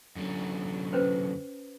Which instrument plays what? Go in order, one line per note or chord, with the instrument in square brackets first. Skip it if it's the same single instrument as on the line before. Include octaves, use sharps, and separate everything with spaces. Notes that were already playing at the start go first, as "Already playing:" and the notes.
[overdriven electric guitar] F#2 D3
[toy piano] C#4 B4 C5